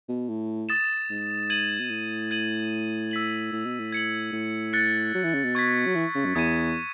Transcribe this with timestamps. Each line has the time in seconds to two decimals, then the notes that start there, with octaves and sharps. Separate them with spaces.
0.09 B2
0.29 A2
0.69 D#6 A6 E7
1.10 G#2
1.50 G#6 D#7 F#7
1.79 B2
1.90 A2
2.31 G#6 D#7 F#7
3.11 E6 B6 F#7
3.52 A2
3.65 B2
3.79 A2
3.92 G#6 C#7 F#7
4.32 A2
4.73 F#6 A6 C#7
5.15 F#3
5.24 E3
5.34 C#3
5.44 B2
5.55 C#6 G#6 B6
5.86 F#3
5.95 E3
6.15 C#3
6.25 F#2
6.35 E2 D#6 G#6 D#7